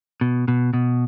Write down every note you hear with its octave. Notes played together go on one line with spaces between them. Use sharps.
B2
B2
B2